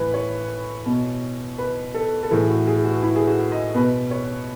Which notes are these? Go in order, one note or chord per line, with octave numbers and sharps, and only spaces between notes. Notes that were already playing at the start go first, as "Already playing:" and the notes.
Already playing: A2 E3 B4
C#5
B2
B4
A4
A4
A2 E3 G#4
F#4
G#4
F#4
E4
G#4
F#4
D#5
B2 B4
C#5